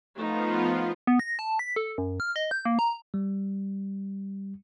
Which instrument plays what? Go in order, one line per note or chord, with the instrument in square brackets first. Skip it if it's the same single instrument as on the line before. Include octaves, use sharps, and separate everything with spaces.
[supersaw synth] F3 B3 F4 [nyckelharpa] A3 D#4
[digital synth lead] B3
A#6
A5
B6
A4
F#2
F6
D#5
G6
A#3
A#5
[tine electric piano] G3